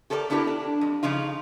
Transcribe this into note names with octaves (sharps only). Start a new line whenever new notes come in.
G4 A4 A#4 C#5 D5
B3 D4 E4 G4 A#4
D4
F2
C#3 F3 D#4 F4